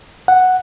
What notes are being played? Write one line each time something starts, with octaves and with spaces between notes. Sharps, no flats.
F#5